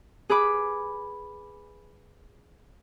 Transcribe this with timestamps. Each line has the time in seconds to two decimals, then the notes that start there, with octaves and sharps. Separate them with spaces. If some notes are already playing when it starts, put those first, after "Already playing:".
0.30 G#4 B4 B5 D6